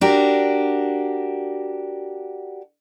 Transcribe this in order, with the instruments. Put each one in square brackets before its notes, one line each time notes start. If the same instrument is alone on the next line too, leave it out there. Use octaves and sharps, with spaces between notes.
[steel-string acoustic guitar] D4 F#4 G4 A#4